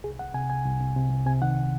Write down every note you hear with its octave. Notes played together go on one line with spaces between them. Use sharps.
C2 G#4
C2 F#5
C3 G#5
C2 G#5
C2
C2
C3
C2
C3 G#5
D#3 F#5